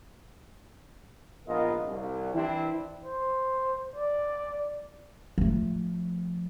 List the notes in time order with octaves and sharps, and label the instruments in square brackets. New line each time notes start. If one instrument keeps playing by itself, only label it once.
[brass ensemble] A#1 G#2 B3 F4 A#4 D#5
C2
E3 C4 D4 E4
[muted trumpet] C5
D5
[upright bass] F3 A3